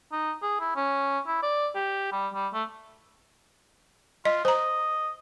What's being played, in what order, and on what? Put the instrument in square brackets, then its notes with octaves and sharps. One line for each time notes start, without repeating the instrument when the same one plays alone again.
[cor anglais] D#4
G#4
E4
C#4
E4
D5
G4
G3
G3
A3
[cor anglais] F4 [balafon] D#5
[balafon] C5 A#5 [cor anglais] D#5